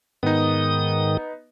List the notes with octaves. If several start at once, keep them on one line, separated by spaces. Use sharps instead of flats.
G#2 D#3 B3 D#4 D#6